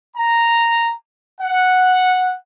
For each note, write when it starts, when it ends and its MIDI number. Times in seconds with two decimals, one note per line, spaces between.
0.17 0.93 82
1.41 2.34 78